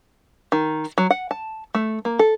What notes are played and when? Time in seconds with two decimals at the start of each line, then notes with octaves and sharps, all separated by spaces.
0.52 D#3
0.98 F#3
1.10 F#5
1.31 A5
1.75 A3
2.05 A#3
2.19 A4